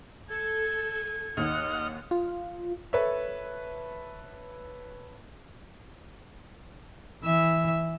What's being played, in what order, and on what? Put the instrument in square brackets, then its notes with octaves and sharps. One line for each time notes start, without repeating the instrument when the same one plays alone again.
[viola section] A4 [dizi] G#6
[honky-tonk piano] D#2 [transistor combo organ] D#5 F6 [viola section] F#5
[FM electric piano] F4
[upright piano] A4 B4 C#5 E5
[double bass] E3 [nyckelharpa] E5